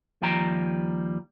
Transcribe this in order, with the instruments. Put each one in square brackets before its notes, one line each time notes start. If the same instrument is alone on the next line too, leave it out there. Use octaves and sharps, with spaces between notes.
[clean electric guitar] D#2 F3 G3 G5 A#5